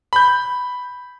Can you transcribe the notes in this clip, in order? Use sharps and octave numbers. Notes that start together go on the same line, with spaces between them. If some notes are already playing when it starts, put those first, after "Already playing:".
B5 G6